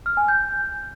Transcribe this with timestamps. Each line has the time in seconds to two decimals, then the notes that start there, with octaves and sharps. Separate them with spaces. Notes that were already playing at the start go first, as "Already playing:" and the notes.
0.06 F6
0.17 G#5
0.28 G6